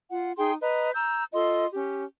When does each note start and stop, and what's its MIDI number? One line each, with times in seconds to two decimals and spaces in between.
0.10 0.32 65
0.10 0.32 78
0.37 0.53 63
0.37 0.53 68
0.37 0.53 79
0.37 0.53 84
0.62 0.91 71
0.62 0.91 75
0.62 0.91 82
0.93 1.23 82
0.93 1.23 88
0.93 1.23 91
1.32 1.65 65
1.32 1.65 69
1.32 1.65 75
1.32 1.65 84
1.72 2.03 61
1.72 2.03 67